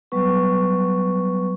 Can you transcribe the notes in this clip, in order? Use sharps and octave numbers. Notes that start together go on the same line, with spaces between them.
F#3 G3 B3 B4 C#6